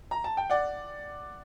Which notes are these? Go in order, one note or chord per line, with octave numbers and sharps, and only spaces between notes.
A#5
A5
G5
D5 F#5